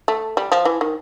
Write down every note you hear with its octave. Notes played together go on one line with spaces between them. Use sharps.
A3
G3
F3
E3
D#3